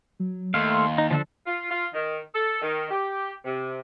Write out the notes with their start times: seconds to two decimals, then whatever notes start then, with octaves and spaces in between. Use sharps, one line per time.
0.20 F#3
0.54 D#2 A3 F5 C6
0.98 D#4
1.11 D3 F3 D4 A4
1.46 F4
1.71 F4
1.93 D#3
2.34 A4
2.62 D#3
2.90 G4
3.45 C3